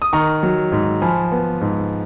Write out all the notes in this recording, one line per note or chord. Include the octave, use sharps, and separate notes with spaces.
D#6
D#3 A#5 C#6
F#3
G#2
F3 G#5 B5
B3
G#2